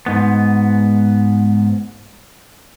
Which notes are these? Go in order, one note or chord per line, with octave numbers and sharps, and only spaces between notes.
G#2 B3